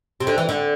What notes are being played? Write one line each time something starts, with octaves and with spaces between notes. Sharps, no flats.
C3
D3
E3
D3